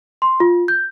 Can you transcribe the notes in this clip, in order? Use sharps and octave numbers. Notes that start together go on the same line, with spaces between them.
C6
F4
G6